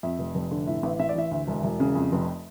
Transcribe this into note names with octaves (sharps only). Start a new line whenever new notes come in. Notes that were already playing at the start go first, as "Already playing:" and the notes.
F2 E5
F1
F1
D3
A2 E5
A1
A1 E5
D5
E3 E5
D2
E1
E1
C#3
F2
F1